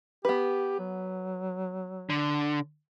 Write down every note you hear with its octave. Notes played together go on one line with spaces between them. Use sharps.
B3 G4 B4
F#3
D3